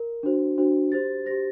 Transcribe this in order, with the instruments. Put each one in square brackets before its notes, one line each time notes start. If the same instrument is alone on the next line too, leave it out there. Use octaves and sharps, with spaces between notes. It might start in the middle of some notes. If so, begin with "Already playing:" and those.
Already playing: [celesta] A#4
D4 F#4 C5
D4 F#4 C5
G4 C5 A6
G4 C5 A#6